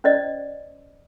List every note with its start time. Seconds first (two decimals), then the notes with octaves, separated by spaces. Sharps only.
0.04 C#4 C5 D5 D#5